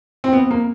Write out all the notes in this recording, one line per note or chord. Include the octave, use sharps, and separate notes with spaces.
C4
B3
A#3